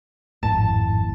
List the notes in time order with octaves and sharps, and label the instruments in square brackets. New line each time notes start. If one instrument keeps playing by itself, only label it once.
[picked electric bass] G#1 F2 A2 [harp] A5